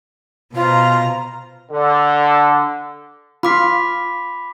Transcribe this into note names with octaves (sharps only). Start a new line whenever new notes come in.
B2 F4 C5 A#5
D3
F4 B5 D6 B6